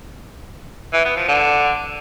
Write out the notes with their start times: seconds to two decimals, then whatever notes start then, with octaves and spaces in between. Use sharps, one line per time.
0.93 E3
1.05 B3
1.17 F3
1.28 D3